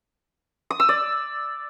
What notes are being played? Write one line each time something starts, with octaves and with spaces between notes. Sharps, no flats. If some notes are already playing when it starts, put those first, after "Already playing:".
D#6
E6
D5